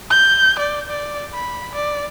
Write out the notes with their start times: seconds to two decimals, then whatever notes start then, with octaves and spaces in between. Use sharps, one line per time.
0.10 G6
0.59 D5
0.90 D5
1.33 B5
1.75 D5